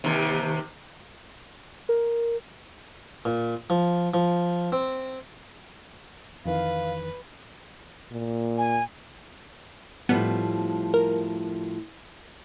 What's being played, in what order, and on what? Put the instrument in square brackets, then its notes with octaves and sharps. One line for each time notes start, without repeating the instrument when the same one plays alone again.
[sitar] D#2 C3
[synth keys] A#4
[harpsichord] A#2
F3
F3
C4
[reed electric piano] F2 D#3 E3 [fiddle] B4 [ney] F5
[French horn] A#2
[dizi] G#5
[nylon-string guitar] A2 F3 G3 [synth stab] B3
[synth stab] A#4